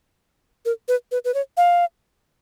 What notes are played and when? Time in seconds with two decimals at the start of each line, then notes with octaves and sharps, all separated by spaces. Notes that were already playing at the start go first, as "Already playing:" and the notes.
0.65 A#4
0.88 B4
1.12 B4
1.25 B4
1.34 C#5
1.57 F5